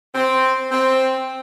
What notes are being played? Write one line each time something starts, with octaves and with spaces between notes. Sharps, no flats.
C4
C4